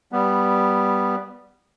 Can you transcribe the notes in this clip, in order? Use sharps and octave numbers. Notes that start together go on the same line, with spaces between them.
G3 B3